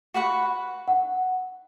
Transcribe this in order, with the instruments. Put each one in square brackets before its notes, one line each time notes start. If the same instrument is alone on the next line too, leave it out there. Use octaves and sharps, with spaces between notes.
[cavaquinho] F#4 B4 F#5 C#6
[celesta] F#5